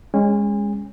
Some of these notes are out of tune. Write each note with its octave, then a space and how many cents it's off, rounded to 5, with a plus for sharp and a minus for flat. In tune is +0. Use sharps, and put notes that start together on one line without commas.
G#3 -15 C#4 +0 G#5 -35